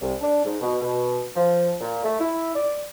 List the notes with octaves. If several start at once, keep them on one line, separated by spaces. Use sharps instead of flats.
C2
D4
G#2
B2
B2
F3
A#2
A3
E4
D5